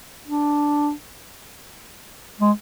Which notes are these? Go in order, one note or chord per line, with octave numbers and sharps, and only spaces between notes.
D4
G#3